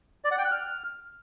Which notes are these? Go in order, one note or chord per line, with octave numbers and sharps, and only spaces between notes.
D5
F#5
G5
F#6
F6